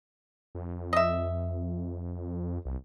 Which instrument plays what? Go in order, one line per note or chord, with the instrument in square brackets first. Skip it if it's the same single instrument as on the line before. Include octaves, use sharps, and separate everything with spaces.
[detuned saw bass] F2
[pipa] D#5 E5
[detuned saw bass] C2